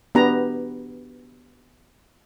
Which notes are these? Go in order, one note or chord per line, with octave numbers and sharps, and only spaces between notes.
B3 D4 G4 B4 A#5